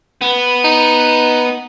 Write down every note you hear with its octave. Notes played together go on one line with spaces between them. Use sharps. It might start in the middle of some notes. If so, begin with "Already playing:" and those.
B3
D#4